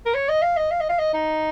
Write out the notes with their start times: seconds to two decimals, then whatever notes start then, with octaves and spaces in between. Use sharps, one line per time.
0.06 A#4
0.14 C#5
0.29 D#5
0.42 F5
0.57 D#5
0.71 F5
0.80 D#5
0.89 F5
0.99 D#5
1.14 D#4